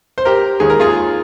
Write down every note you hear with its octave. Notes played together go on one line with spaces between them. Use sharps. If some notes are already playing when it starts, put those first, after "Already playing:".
C5
G4 A#4
D#2 D#3 G#3 G#4
A#4
F4 G#4